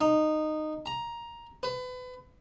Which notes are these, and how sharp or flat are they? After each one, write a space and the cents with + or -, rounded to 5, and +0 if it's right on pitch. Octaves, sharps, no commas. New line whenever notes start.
D#4 -15
A#5 +10
B4 +30